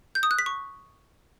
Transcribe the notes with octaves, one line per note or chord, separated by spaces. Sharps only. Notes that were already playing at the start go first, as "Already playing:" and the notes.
G6
D#6
F#6
B6
C#6